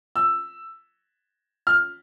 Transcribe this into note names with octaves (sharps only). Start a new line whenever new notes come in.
E6
F6